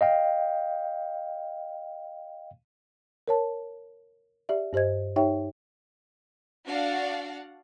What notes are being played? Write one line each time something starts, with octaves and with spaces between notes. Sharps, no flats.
D#5 F5 G5
A#4 C#5 A5
G4 D5 E5
G2 G4 C5 D#5 G#6
D#4 G4 C#5 E5 G5
D4 F#4 D5 F5 F#5